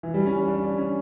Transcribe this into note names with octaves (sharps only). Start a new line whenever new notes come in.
E3
G3
C#4
D4
D4
D4
C#4